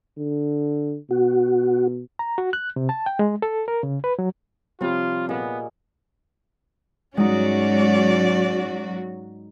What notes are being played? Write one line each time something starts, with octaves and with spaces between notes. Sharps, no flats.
D3
B2 F#4
A#5
F#4
F#6
C3
A5
G5
G#3
A4
A#4
C#3
B4
F#3
C3 F3 G3 C4 F4 C#5
A#2 B3 G#4 D#5
G#2 F#3 G#3 C#4 D#4 F#4 D5